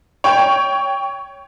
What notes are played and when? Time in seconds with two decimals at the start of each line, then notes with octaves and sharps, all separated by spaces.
0.24 C#5 G5